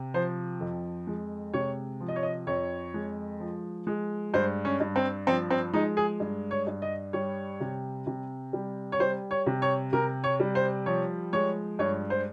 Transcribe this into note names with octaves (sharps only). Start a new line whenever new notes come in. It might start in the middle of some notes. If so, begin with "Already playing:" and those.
Already playing: C3
F3 C5
F2
G#3
C3 C#5
F3
D#5
C#5
D#5
F2 C#5
G#3
F3
G#3
G2 C5
C#4
G2
C4
F3 C4
C4
G#3 D#4
G#4
G2
C#5
G2
D#5
G3 C#5
C3
C3
G3
C#5
G3 C5
C#5
C3
C#5
C3 A#4
C#5
G3
C5
F3 C#5
G#3 C#5
G2 C#5
C5